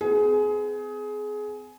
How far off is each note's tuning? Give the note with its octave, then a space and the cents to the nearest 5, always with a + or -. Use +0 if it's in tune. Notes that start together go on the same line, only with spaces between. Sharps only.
C4 -40 G#4 +20